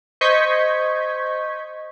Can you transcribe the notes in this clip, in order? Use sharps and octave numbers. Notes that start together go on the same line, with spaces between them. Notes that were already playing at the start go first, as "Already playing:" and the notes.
C5 D#5 C#6 G6 G#6 B6